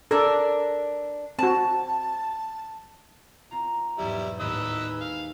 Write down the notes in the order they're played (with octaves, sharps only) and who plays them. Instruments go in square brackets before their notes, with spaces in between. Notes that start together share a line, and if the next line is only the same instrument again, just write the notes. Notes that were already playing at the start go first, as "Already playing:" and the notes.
[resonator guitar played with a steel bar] D4 A#4 [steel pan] A4
[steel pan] C4 F#4 [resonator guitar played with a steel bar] A5
[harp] C4 F4 A#5
[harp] B1 E2 G#2 [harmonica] G3 E4
[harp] G#1 D#2 A2 [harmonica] B4 D#5 E6
[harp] B4 G#5 B5
[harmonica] F5